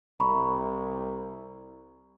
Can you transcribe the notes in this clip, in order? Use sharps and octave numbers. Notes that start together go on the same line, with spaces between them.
C2 A#5 B5 C#6